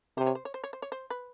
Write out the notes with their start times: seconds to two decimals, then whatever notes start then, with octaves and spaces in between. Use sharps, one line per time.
0.17 C3 C5
0.27 C#5
0.35 C5
0.45 C#5
0.54 C5
0.64 C#5
0.73 C5
0.82 C#5
0.92 C5
1.10 B4